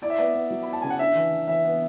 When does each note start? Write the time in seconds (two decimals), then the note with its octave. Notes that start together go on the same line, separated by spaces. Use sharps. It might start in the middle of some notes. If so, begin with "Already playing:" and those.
0.02 E4 D5
0.10 E5
0.18 B3 D5
0.34 B3
0.50 F#3
0.63 B5
0.67 E4
0.73 A5
0.82 C#3 G#5
0.90 F#5
0.99 D4 E5
1.15 E3
1.32 E3
1.48 E3 E5
1.64 B3